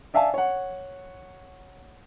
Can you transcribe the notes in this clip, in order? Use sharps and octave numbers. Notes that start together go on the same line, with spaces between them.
D5 E5 F5 G#5 A5
C#5 F#5